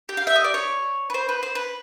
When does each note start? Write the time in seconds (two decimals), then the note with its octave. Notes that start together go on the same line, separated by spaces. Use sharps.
0.09 G4
0.17 F5
0.27 E5
0.36 D#5
0.44 D5
0.54 C#5
1.10 B4
1.14 C5
1.29 B4
1.43 C5
1.55 B4